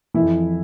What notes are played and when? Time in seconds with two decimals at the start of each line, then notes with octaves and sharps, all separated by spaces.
0.14 F2 E3 E4